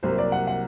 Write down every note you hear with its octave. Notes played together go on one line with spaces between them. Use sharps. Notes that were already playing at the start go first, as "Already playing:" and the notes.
C2 C3 F#3 A#3 C5
D5
F#5
F#5